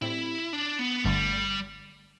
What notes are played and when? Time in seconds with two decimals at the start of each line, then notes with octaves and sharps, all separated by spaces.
0.02 A2 G3 C4 E4
0.53 D4
0.79 B3
1.04 G1 G2 D3 G3 A3